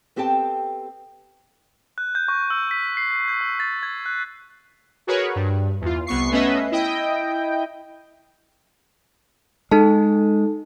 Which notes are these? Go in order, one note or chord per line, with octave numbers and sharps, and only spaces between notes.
B3 C4 G4 A4 G5 A5
F#6
G6
C#6
E6
B6
C7
G6
E6
A6
G#6
F#6
F#4 G#4 A#4 B4 C#5
G2
E2 F4
C2 B3 C#6 C7
A3 B3 C#4 B4 D#5 E5
E4 D#5 G5
G#3 D#4 A4 A5